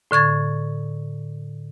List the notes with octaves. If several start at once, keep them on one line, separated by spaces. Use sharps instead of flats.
A2 D3 C#6 G#6 A6